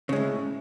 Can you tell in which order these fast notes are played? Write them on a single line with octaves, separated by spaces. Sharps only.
C#3 G#3 A2